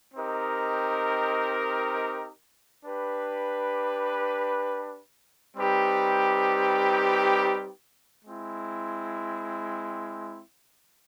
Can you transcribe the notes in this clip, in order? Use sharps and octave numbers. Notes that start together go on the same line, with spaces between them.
C4 D#4 G4 A#4 D#5
D4 G4 B4
G3 C4 D#4 G4 B4
G#3 C4 E4